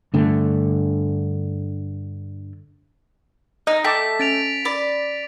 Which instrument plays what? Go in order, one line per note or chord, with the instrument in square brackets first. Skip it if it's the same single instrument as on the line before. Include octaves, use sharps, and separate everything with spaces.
[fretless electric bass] G2 D3 A3
[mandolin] D#4 [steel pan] D#5
[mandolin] A3 [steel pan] G5 A5 D6 [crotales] B6
[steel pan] C#4 [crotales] A6 D7 F7
[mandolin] D5 B5